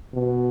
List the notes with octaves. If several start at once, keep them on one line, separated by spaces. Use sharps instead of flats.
B2